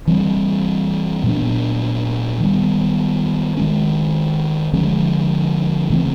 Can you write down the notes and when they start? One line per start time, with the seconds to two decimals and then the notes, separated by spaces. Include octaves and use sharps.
0.07 E3 G3 C4
1.24 A#2 F#3 B3 D4
2.40 D#3 G3 B3
3.57 D#3 G#3 C#4
4.73 D3 F3 G#3 C#4
5.90 C#3 E3 A3 C4